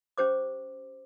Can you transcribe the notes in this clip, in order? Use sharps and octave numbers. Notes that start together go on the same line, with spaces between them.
C#4 G4 C5 D6